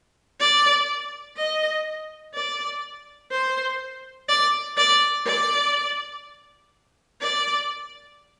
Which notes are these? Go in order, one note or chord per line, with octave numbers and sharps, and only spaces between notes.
D5
D#5
D5
C5
D5
D5
D5
D5